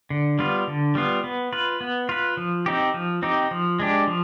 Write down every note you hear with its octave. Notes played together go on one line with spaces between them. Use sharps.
D3
G3 B3 F4
D3
G3 B3 F4
B3
F4 B4
B3
F4 B4
F3
C4 D#4 G4
F3
C4 D#4 G4
F3
G#3 D4 G4
F3